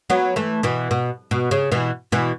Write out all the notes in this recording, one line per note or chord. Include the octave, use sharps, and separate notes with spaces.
F#3 B3
E3 A3
B2 E3
B2
B2
C#3
B2 E3
B2 E3